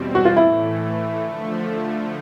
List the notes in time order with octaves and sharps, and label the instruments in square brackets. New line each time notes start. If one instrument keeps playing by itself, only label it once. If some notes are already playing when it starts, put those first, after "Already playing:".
Already playing: [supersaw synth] E2 B2 G3 C4
[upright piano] F#4
F4
[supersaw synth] A2 E3 A3 [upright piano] E4
[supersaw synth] D3 F3 A3